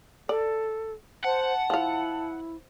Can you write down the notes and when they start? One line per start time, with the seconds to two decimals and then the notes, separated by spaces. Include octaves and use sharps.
0.29 A4 D5
1.24 C5 F#5 A5
1.70 F3 E4 F5